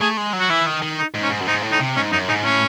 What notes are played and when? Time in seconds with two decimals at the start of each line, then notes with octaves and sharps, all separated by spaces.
0.01 A3 G#4
0.17 G#3
0.33 F#3
0.40 F#4
0.49 E3 E4
0.66 D#3
0.82 D#3
0.99 D#4
1.15 G#2
1.23 C#4
1.30 G#2
1.41 F#2
1.47 G#2 D#4
1.63 A2
1.72 D#4
1.80 C3
1.96 G#2 C#4
2.12 F#2 D#4
2.28 G#2 D#4
2.45 A2 C#4